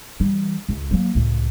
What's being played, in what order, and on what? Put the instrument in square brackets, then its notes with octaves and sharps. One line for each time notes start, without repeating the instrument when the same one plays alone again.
[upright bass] E3 G3
C#2
F#3 A#3
C#2 A2